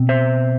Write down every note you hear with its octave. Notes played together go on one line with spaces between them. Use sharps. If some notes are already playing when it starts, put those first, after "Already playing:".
Already playing: B2 C4
C5 E5